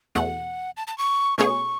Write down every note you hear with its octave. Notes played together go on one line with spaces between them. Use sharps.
E2 B2 A3 F#5
A5
A5
C#6
B2 A3 C#4 G#4 C#5 C#6